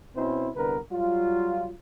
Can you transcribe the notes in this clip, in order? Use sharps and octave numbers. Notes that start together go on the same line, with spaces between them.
B2 C4 C#4 E4 C5
C2 D3 B3 A#4 B4
F#3 G3 F4